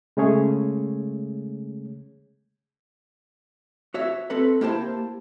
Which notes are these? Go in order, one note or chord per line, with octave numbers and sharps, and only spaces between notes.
C#3 G#3 A3 C#4 G#4 C#5
F#4 C#5 E5
C4 A4 B4
A#3 E4 G4 C5 A5